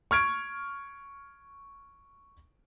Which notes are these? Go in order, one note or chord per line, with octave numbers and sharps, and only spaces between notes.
C#6 F6 G#6 D7